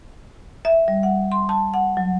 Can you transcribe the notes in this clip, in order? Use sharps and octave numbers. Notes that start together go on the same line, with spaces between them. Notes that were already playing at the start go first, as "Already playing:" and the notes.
E5
G3
F#5
C6
A5
F#5
F#3